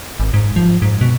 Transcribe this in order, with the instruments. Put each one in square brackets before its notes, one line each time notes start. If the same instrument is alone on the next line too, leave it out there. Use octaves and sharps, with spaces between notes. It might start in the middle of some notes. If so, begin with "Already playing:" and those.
[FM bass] G#1
G#2
F3
G#2
B2